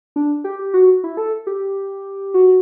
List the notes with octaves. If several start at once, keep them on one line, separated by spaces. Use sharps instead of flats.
D4
G4
G4
F#4
E4
A4
G4
F#4